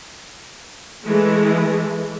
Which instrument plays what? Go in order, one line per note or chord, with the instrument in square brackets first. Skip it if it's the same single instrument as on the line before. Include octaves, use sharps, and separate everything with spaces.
[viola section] E3 G#3 A3